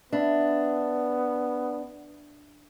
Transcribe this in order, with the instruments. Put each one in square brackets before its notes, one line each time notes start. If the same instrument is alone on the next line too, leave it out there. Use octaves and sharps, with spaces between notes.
[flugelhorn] B3 [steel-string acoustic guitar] D4 [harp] B4 E5 B5